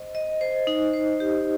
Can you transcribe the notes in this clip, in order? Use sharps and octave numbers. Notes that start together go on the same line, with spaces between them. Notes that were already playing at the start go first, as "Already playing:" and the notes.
Already playing: C5 D#5
D#5
C5
D#4
C5
G4